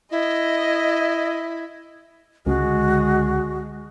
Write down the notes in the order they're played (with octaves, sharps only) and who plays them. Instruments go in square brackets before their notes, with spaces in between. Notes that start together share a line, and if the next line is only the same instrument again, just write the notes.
[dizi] E4 [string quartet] D#5
[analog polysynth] C#2 [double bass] D3 G#3 [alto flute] F#4